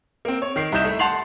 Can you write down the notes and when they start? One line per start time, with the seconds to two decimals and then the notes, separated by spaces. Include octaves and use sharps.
0.25 A#3 C4
0.42 C#5
0.56 D#3 C7
0.72 C2 E4 D#5 G6 E7
0.84 A3
0.99 F#5 A5 C6 C7 F7 F#7